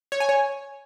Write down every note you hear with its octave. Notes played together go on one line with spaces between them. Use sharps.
C#5
G#5
C#5